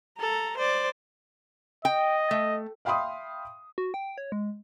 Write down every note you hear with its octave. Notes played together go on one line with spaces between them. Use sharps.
A4 A#5
C5 D5
D#5 G5
A3
E5 F5 G5 B5 C6 D#6
F#4
G5
C#5
G#3